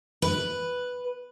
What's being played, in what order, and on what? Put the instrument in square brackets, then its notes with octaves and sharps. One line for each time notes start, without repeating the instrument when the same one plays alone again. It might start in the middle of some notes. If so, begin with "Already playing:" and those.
[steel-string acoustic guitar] B4